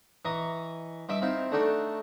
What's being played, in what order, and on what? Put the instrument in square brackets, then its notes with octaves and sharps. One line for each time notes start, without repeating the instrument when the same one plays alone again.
[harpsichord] E3 D#5 A#5 C#6 D#6
G2 D#5 E5 B5 D6
C4 D#4 E4 F5
A3 D4 D#4 F#4 A4